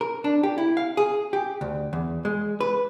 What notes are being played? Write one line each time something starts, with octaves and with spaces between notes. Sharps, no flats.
A#4
D4
G4
E4
F5
G#4
G4
D2
E2
G#3
B4